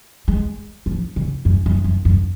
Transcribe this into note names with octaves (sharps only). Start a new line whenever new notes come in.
G#3
F3
C#3
F#2
F#2
F#2
F#2